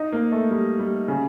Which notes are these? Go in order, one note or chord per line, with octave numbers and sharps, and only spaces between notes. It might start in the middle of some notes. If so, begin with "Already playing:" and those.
Already playing: D#4
A#3
A3
G3
G3
C#3